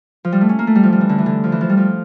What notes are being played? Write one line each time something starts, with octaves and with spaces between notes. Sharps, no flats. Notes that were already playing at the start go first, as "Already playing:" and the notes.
F3
G3
A3
C#4
A#3
A3
G3
F3
G3
E3
D3
E3
D3
F3
E3
F3
G3
F3